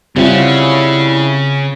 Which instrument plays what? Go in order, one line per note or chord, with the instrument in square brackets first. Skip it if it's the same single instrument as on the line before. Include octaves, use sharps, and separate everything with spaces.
[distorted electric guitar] C#3 C#4 [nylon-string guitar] G3 C5 F#5 [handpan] C4 F4 [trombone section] E4